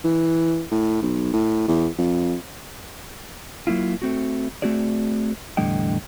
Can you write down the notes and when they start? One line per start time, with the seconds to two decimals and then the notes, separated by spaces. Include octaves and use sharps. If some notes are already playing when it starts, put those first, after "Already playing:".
0.04 E3
0.72 A2
1.02 B1
1.34 A2
1.68 E2
1.98 F2
3.67 F#3 A#3 E4 F4
4.02 A3 C4 F#4
4.62 A3 C4 F#4 G#4 D5
5.57 E2 A2 D3 G3 D#5 G5